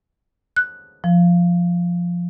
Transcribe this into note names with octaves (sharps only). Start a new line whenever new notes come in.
F#6
F3